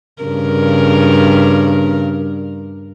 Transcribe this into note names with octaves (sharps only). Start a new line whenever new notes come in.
G2 C#3 A#4